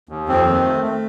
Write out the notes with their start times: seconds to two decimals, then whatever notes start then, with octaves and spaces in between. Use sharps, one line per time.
0.09 D#2
0.28 F2 C4
0.47 D#3
0.65 A3
0.82 A3